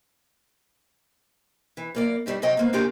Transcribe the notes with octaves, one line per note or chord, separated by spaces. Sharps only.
E3
F#2 A#3 D5
G2 G3 A3 D#4
C3 F#3 D#5 G5 A#5
G#2 A#3 B3
C#3 A#3 D4 F4 G4 G#4